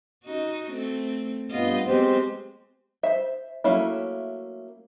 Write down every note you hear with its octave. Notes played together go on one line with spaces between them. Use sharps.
C#4 D#4 F#4
A3 C4
G2 B3 F4 D#5
F#3 G#3 B3 C4 G4 C5
C5 E5
F#3 A3 A#3 C#4 E4